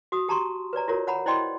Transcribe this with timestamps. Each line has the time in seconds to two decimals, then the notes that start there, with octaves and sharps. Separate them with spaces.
0.12 F#4 D#6
0.28 G4 A5 A#5 C6 C#6
0.73 B4 C#5 D5 A#5
0.88 F4 F#4 A#4 C#5
1.07 C#5 F#5 A#5 B5
1.26 E4 C5 D5 D#5 G5 C6